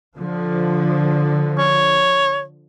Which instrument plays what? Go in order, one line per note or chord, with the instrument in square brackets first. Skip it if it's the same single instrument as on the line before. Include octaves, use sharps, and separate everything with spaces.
[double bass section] D3 F3
[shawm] C#5